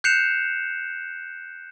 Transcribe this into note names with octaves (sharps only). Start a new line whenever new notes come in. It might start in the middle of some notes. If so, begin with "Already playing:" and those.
F#6 G6 C7 C#7 E7 F7